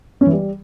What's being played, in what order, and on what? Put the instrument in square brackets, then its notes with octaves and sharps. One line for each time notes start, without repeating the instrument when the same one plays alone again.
[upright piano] C#4
E3
G3